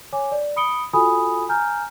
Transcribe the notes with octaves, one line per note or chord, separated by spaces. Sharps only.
C#5 G#5 D6
D5
B5 D#6 C#7 D7 G7
F4 F#4 A4 G#5 B5 D#6
G#5 A#5 F6 G6